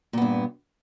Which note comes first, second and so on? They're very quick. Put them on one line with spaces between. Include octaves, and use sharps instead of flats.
A#2 B3 G2